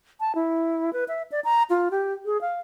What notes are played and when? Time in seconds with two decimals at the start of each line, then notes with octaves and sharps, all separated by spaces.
0.20 A5
0.35 E4
0.93 B4
1.08 E5
1.32 D5
1.44 A#5
1.70 F4
1.91 G4
2.25 G#4
2.41 F5